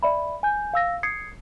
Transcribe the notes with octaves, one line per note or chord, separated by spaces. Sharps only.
D5 E5 B5
G#5 G6
F5 E6 A#6
D#6 G#6 C7 C#7